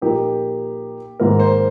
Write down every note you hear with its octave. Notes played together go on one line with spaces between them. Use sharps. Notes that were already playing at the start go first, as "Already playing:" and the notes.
A#2 F3 A#3 D#4 G4
G#2 D#3 A#3 D#4 A#4
C5